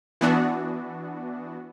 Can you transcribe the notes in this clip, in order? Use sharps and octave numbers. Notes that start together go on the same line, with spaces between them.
E3 B3 D4 F#4